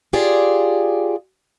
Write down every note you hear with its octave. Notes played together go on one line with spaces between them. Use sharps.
F4 G4 G#4 D5